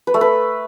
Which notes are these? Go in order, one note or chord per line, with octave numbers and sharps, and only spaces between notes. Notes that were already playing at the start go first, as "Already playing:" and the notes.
B4
A3
B4